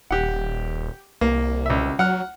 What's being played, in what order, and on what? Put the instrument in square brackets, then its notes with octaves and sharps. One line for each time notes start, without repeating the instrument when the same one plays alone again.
[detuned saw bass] D#1 [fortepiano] G4 F#5
[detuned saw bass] C2 [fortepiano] A#3
[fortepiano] C#2 E5
[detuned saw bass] F#3 [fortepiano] F#5 F6